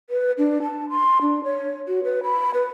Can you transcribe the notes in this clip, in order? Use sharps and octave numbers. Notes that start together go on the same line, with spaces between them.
B4
D4
A5
C6
D4
C#5
F#4
B4
B5
B4